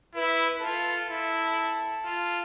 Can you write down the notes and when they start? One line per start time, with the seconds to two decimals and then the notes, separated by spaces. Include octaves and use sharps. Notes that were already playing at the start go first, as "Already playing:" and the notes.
0.15 E4 B4
0.63 F4 A4
1.11 E4
2.05 F4